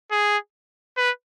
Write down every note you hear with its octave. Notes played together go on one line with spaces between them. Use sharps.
G#4
B4